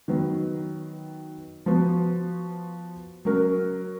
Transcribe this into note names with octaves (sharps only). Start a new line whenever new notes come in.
D#3 F#3 B3
F3 B3 F#4
F#3 C#4 F#4 A#4